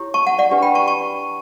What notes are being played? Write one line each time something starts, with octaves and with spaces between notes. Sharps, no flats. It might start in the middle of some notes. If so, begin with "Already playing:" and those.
Already playing: E4 G4 C#5
A5 C#6
F#5 A5
D5 F#5
D4 G4 B4
G5 B5
A5 C#6
A5 C#6